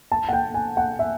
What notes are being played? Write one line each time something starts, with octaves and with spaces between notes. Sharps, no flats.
A5
F#5
G5
G#5
F#5
E5